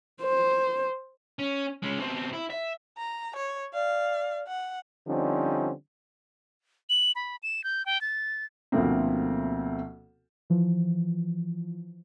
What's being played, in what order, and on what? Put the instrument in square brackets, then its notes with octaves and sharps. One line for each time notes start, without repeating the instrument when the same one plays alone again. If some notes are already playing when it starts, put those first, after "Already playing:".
[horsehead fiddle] C5
[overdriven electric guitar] C#4
G#3 C#4
B2 C4
E4
E5
[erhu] A#5
C#5
[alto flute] D5 [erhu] F5
[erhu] F#5
[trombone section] D3 F3 G3 C4 C#4 D#4
[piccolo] F#7
B5
E7
G6
G5
A6
[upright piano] D2 B2 F3 A3 A#3 C4
[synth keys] E3 F3